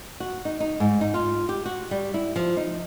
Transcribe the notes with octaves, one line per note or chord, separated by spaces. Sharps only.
F#4
D#4
D#4
G#2
D#4
F4
G4
F#4
G3
E4
F3
D#4